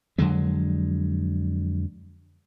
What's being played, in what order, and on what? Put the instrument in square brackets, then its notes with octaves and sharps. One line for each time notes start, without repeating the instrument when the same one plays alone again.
[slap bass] F2 D3 F#3 G#3